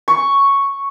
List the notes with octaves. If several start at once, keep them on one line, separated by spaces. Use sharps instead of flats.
C#6